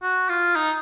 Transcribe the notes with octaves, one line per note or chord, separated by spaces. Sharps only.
F#4
F4
D#4